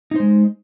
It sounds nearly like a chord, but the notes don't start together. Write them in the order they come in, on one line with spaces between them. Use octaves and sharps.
D#4 C5 G#3